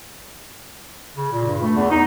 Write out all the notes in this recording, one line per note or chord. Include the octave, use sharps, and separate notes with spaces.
C#3
A#2
G2
A3
E2
D#4